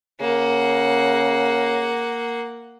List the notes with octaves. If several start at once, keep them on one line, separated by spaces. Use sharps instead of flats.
C#3 A#3 F#5